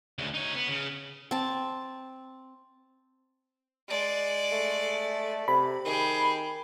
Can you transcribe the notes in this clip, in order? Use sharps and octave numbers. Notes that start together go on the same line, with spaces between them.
D2 C#3
D#4 C#5
B3
C#3
C4 A5
G#3 D5
A3
C3 B5
D#3 G4 G#4